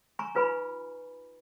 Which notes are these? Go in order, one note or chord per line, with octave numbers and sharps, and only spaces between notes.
G#5 A#5 C#6
D#4 F4 B4 G#5 B5